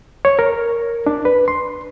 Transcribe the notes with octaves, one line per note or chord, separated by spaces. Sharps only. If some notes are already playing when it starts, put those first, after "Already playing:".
C#5
A#4
D4
B4
C6